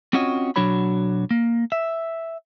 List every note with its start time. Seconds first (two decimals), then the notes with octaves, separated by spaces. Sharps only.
0.13 C4 C#4 F4 F#4 C#5 D#5
0.56 B1 F#3 D4 F#4 C#5 B5
1.31 A#3
1.72 E5